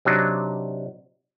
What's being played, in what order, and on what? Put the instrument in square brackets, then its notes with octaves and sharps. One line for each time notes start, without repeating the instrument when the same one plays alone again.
[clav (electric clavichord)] C3 F#3 D4 D#4